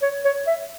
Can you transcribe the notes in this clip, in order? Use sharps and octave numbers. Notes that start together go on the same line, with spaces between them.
C#5
C#5
E5